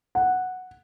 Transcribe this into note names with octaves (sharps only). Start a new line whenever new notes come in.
F#5